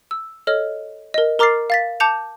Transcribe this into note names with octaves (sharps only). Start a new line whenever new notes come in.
E6
A4 C#5 D#5 F6
A#4 D#5
A#4 A#5 D6 F6 A6 C7
F5 A6 B6
A5 D6 G6 C#7 F7